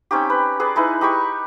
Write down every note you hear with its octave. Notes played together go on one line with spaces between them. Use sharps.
C4 C#4 D#4 G4
B4
G#4 B4 D5
G#3 D#4 E4 B4
D#4 G4 B5 C#6